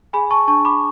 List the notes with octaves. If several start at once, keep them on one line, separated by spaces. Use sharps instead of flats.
G#4 G#5 B5
A5 C#6
D4 A5 C#6
B5 D6